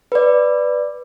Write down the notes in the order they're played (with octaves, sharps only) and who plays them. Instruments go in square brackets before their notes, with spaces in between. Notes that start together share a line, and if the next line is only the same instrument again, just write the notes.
[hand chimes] B4 D5